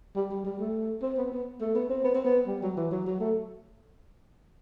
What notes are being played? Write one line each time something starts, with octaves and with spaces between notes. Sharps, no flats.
G3
G3
G3
A3
C4
B3
B3
A3
B3
C4
B3
C4
B3
G3
F#3
E3
F#3
F#3
A3